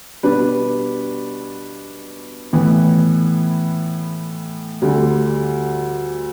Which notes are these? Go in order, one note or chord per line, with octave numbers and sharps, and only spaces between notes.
B2 G3 D4 B4
A2 E3 B3
D2 D3 G3